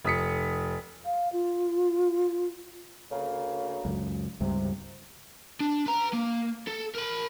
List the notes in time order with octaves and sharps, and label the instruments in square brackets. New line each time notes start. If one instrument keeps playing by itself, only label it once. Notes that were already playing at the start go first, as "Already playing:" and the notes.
[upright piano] F1 D#6 B6 C#7
[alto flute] F5
F4
[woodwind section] D2 C#3 A#3
[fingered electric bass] C#2 F#2
[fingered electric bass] C#2 G2 G3 [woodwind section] C3
[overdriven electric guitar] D4
B4 A#5
A#3
A4
A#4 B5